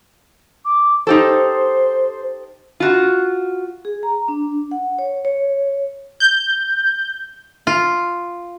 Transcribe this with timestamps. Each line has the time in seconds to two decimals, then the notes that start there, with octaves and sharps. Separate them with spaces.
0.65 D6
1.07 D#4 G4 A4 C5
2.80 F4 F#4
3.85 G#4
4.03 A#5
4.28 D4
4.71 F#5
4.99 C#5
5.25 C#5
6.20 G6
7.67 F4